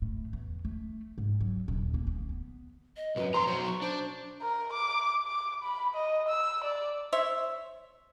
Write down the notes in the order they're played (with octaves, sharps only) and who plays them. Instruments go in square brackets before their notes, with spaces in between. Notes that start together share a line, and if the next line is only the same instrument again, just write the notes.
[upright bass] A2
E2
A3
G#2
F#3
D#1
A#3
D2
B3
[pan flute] D#5
[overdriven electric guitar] B1 F#2 [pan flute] B4
[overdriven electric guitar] F3 A#5 [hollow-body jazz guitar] C6
[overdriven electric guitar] B1 F#3 [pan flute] C5
[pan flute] C#6
[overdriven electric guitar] D4 [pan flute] C5
[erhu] A#4
D6
D6
B5
D#5
E6
D5
[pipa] C5 C#5 E5